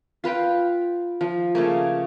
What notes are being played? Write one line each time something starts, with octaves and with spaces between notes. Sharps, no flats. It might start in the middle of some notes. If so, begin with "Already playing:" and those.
F4 B4 F5 G5
F3
C#3 A3 A#3